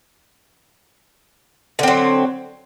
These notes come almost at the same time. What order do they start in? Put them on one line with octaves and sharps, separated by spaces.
D3 C4 F#3